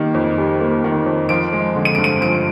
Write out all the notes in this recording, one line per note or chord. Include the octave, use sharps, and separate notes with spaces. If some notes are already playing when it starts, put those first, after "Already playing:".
Already playing: D#3 G3 A#3
F2
G3
A#3
D#3
F2
F3 D7
G#3
D3
D#7
G2 D7
D#7
F3 D7